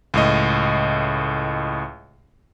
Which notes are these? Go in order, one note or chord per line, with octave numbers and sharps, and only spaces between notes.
C#2 A2 D#5